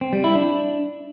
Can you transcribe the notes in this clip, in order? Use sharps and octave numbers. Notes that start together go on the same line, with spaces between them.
C4
G3
E4
D4